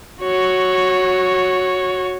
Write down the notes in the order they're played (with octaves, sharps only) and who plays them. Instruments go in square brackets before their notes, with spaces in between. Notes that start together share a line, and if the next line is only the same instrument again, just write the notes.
[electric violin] F#4 C#5